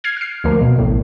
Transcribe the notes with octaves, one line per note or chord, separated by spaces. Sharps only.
F6 G#6 C7
F6 C7
D2 F3 A#3
B2
A1 A2